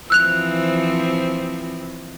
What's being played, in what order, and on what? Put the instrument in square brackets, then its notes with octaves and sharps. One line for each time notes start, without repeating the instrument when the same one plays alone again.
[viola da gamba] E3 F3 C4 [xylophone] E6 F#6 F7